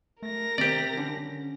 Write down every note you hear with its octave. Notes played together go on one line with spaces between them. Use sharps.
A3 A#4 A#6
C3 D#3 C4 G4 D5
D3 C#4